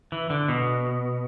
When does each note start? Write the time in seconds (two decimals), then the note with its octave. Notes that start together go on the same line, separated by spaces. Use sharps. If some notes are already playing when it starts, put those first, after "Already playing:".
0.12 E3
0.30 D3
0.48 B2